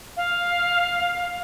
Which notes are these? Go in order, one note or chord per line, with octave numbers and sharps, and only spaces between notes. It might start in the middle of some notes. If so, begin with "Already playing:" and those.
F5